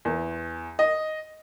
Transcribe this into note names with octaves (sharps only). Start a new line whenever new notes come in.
E2
D#5